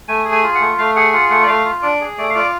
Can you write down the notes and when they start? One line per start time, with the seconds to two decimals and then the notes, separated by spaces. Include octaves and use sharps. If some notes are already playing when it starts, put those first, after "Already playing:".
0.08 A3 G#5
0.25 G#4
0.32 G#5
0.43 F4
0.55 F#5
0.61 A3
0.78 A3 F5
0.96 G#4 F#5
1.13 F4 F#5
1.30 A3 F#5
1.43 D5
1.47 A3 F5
1.65 F4
1.82 D4 D5
2.01 G#4
2.18 A3 D5
2.30 F5
2.35 F4 D5